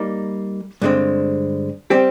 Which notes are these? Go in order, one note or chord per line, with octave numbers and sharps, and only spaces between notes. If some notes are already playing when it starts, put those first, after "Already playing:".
Already playing: G3 A#3 D#4
G2 D3 G#3 C4
G3 C4 G4